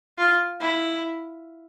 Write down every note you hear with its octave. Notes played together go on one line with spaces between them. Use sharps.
F4
E4